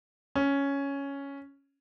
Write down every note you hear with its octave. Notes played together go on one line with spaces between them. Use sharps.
C#4